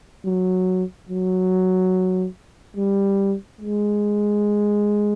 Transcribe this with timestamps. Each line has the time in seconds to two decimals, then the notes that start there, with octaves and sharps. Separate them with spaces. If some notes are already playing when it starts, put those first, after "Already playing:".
0.25 F#3
1.09 F#3
2.77 G3
3.61 G#3